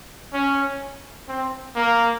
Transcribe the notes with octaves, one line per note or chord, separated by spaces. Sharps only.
C#4
C4
A#3